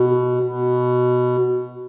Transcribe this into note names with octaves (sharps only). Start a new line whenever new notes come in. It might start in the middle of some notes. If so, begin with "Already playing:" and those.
Already playing: B2
B2